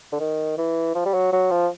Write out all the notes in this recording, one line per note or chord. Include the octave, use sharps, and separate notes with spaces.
D3
D#3
E3
F3
G3
F#3
F#3
F3